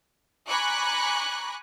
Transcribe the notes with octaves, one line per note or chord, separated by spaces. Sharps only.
G#5 A#5 B5 C#6 D6 F#6